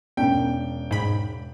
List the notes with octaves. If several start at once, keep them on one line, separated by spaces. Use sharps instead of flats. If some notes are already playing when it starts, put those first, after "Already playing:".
E1 B3 C#4 D4 G5
G#2 B5